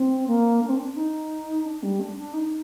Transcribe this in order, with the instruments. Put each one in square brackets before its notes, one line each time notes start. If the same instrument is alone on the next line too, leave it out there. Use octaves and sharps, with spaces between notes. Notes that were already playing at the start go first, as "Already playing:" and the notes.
Already playing: [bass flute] C4
A#3
D4
C4
D4
D#4
D4
G3
D4
D4
D#4